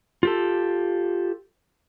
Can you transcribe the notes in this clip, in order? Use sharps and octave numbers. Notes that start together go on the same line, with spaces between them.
F4 G4 A4